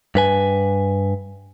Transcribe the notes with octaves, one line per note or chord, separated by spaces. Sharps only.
G2 B4 G#5